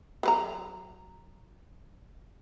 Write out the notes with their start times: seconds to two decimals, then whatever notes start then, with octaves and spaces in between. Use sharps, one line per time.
0.23 F#3 B4 A#5